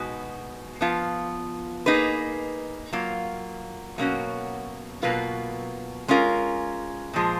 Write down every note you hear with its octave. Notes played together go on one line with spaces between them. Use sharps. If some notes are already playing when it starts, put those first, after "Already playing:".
Already playing: B2 G#3 D#4 F#4 B4
F3 B3 F4
A#3 D#4 G#4 B4
F#3 A#3 F4
B2 F#3 A#3 C#4 F#4
B2 F#3 A#3 F4 B4
G#3 C#4 F4 A#4
A#2 F3 G#3